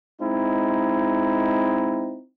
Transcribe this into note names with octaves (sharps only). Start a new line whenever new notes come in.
G#3 C4 D#4 E4